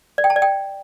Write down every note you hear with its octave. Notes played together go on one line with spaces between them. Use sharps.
D5
G5
A5
D5
G5